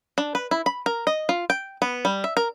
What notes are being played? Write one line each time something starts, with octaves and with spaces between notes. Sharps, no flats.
D4
B4
E4
B5
A#4
D#5
F4
G5
B3
G3
E5
A#4